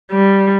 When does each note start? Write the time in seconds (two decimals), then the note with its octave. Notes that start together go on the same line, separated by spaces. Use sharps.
0.12 G3